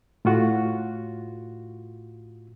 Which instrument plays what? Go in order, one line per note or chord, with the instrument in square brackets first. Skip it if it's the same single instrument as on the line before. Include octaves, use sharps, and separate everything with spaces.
[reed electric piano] A2 F4 F#4